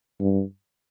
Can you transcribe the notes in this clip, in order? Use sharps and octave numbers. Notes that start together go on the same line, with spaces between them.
G2